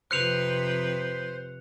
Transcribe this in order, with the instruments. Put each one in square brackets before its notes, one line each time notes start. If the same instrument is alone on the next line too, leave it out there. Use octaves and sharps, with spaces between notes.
[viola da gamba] F2 C3 B4 [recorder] C5 [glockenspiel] F#6 C#7 F7